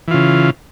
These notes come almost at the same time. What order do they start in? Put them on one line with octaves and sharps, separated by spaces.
E3 F4 C#3